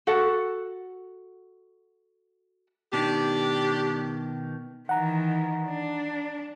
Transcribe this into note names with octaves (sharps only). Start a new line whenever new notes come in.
F#4 A4 F#5
B2 D#3 D4 G4
D#3 E3 F#5 A#5
D4